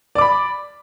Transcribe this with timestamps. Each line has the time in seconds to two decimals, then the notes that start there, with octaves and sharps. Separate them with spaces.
0.15 D5
0.18 D6
0.21 B5